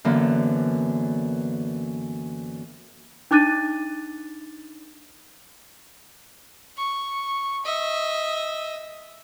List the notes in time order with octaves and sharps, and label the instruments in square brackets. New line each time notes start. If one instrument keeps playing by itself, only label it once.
[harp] F#2 D3 E3 A#3 B3
[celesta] D4 D#4 D6 F#6 A6 D#7
[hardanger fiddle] C#6
D#5 E5